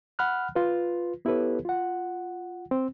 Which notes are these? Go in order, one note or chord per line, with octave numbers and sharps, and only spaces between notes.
F#5 B5 F6 F#6
F4 B4
B3 E4 G4 A4 B4 C#5
F4 F#5
C4